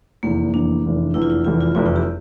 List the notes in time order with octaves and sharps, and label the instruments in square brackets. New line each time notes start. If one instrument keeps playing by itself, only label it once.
[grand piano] F1 E2 E3 [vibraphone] A#3
[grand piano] F1 E2 E3 [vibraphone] D4
[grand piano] F1 E2 E3
[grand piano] F1 E2 E3 [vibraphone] E4
[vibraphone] F4
E4
[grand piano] F1 E2 E3 G3 [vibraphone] F4
[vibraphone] F4
[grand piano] F1 E2 E3 G3 [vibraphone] F4
[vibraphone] E4
G4